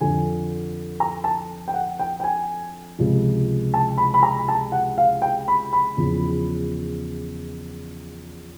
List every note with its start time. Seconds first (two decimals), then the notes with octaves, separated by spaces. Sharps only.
0.01 F2 D3 F3 G#5
1.00 A#5
1.24 A5
1.68 G5
1.74 F#5
1.99 G5
2.20 G5
2.24 G#5
2.98 C#2 C3 F3
3.74 A5
3.98 B5
4.14 B5
4.23 A#5
4.48 A5
4.72 F#5
4.98 F5
5.22 G5
5.48 B5
5.73 B5
5.97 E2 C#3 F3